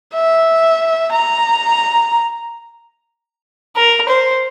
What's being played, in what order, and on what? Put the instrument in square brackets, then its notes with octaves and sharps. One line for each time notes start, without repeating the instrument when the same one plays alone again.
[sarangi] E5
A#5
[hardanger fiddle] A#4
C5